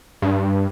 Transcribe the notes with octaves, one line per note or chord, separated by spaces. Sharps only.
G2